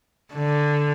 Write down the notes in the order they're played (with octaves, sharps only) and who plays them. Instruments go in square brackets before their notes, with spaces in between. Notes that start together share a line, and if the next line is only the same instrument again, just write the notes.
[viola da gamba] D3